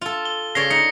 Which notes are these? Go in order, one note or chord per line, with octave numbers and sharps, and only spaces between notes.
F4 A4
G7
C#3 C#5 D5 A#6 C7 G7
D#4 A#6 C#7